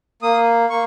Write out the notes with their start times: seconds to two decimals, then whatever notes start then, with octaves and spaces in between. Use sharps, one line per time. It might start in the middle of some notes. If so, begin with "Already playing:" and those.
0.22 A#3 D#6
0.70 A#3 C#6